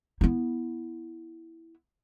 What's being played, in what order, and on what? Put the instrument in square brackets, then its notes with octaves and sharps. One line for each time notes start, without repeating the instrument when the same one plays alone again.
[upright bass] B3 E4